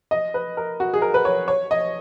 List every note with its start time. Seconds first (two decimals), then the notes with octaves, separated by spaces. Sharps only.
0.11 D#5
0.34 B4
0.57 A#4
0.80 F#4
0.94 G#4
1.02 A#4
1.14 B4
1.25 C#5
1.48 C#5
1.71 D#5